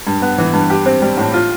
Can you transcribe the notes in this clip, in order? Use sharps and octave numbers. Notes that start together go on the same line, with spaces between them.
G2
B3
E3
G2
G4
C4
G3
A2
F4